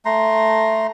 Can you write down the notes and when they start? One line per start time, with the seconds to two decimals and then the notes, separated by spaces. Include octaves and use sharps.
0.05 A3 A#5 C6